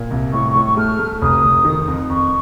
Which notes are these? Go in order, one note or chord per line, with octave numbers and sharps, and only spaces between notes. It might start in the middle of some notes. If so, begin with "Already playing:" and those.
Already playing: A#2
C2
A2 C#6
C#6
A2
C#6
A3 F6
A3
F1 D#6
F1
D#3
F2
F2 C#6